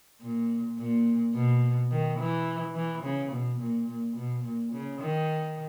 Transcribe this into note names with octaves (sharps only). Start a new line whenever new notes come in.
A#2
A#2
B2
D#3
E3
E3
C#3
B2
A#2
A#2
B2
A#2
C#3
D#3